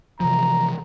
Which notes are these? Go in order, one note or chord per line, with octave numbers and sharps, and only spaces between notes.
C3 E3 F3 A#5